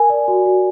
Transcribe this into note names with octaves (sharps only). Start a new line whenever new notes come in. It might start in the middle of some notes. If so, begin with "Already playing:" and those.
Already playing: A#4 G#5
D5
F#4
F#4